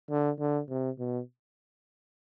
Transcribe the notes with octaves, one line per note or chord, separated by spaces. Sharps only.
D3
D3
C3
B2